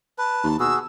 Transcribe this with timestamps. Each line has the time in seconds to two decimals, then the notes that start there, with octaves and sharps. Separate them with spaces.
0.18 B4 A5
0.43 D#2
0.60 B2 F#4 G#4 E6